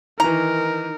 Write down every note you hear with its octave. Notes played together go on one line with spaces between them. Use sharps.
D#3 E3 D#4 A#4 A#5